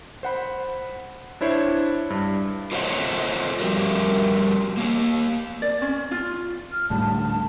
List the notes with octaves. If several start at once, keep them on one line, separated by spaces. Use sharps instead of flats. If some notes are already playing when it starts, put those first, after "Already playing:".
C5 F#5 B5
D4 E4 C5 C#5
G2
F4 A4 C5 C#5 D#5 F#5
F3 G3 F#4 G4 A#4
A#3 G4
D5
C#4
F4
F6
D2 A2 G3 A5